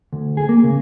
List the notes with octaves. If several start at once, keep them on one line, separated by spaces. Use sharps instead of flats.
D2
G#4
A#3
C#3